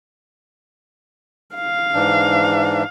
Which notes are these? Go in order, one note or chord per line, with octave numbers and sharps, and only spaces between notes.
F5
G#2 E3 D4